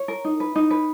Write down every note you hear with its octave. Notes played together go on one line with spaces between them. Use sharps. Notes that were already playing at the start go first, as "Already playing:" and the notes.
Already playing: C#5
A#4
D#4
B4
D#4
B4